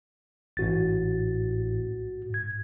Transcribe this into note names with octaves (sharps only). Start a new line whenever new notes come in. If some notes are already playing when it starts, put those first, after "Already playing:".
A1 G#2 F#4 A6
G#2 G#6